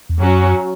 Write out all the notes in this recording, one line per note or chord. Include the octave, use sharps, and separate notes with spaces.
E2
F#2 F#3 C#4 F#4